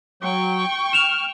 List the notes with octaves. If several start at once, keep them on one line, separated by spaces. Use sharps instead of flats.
F#3 G5 C#6
F6 E7 F7